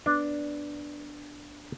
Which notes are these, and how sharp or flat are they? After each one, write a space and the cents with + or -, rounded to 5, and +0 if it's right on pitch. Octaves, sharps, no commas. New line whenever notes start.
B3 +0 D4 +0